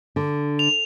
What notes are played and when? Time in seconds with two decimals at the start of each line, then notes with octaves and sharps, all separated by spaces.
0.16 D3
0.59 F7